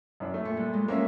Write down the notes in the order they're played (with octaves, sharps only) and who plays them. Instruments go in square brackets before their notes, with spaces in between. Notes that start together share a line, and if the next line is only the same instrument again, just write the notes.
[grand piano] F#2 D4
A3
[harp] A#2 C#6
G2
G#3
[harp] G#3 [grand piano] A#3 C#4 E5